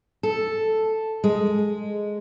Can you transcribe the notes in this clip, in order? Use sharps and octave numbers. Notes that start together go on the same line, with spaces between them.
A4
G#3